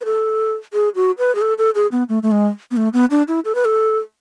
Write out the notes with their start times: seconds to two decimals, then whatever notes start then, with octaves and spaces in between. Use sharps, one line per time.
0.01 B4
0.05 A4
0.73 G#4
0.95 F#4
1.18 B4
1.35 G#4
1.42 A4
1.58 A4
1.75 G#4
1.92 B3
2.09 A3
2.23 A3
2.31 G#3
2.71 B3
2.77 A3
2.93 B3
3.11 D4
3.28 E4
3.45 A4
3.55 B4
3.65 A4